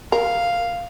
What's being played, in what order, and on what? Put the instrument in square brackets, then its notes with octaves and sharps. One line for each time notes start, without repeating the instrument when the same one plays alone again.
[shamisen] A#4 [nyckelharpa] F5